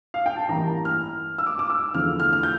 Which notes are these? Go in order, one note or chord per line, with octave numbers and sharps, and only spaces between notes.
F5
G5
A5
A1 G2 E3 A#3 A#5
F6
E6
D6
D6
E6
E2 D3 F3 A3 F6
F6
F6
G6